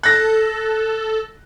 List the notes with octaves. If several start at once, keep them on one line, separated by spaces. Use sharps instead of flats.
A4 F#6 A#6